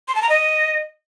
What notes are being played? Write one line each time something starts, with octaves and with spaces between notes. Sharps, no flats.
C6
A5
A#5
D#5